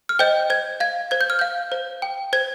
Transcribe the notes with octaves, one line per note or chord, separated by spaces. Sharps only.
F6
C5 D#5 G5 G6
C5 G#6
F5 G#6
C5 G#6
G6
F6
F5 G6
C5
G5
C5 G#6